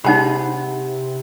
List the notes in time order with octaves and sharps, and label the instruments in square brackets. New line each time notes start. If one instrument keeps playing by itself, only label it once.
[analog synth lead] C3 [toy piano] D#4 A5 B5 [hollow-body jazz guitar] G#4 F#5